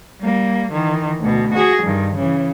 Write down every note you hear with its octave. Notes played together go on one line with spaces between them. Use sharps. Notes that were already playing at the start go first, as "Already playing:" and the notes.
G3 A#3
D#3 E3
D2 B2
F#4 G#4
G2 D#3
C#3 E3